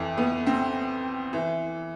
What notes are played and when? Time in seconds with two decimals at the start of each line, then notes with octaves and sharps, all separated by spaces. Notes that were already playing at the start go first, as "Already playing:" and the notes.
Already playing: F2 E3
0.17 B3
0.46 C4
1.33 E3